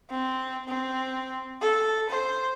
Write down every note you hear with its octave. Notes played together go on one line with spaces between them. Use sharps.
C4
C4
A4
C5